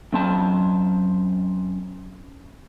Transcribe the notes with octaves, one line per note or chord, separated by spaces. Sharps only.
F#2 C4 A5